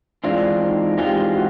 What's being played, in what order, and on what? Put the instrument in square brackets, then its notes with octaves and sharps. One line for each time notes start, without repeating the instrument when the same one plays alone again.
[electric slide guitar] E3 G#3 C4 F4 [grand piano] D4
[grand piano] D#4
[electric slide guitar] E3 G#3 C4 F4 [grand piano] G4
[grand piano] F#4